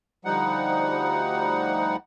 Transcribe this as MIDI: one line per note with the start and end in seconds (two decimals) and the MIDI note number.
0.25 1.96 38
0.25 1.96 53
0.25 1.96 55
0.25 1.96 63
0.25 1.96 78